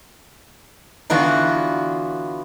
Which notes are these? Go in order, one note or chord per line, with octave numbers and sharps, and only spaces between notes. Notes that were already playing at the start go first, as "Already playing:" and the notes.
D3 E3 B3 F4 F#4 F#5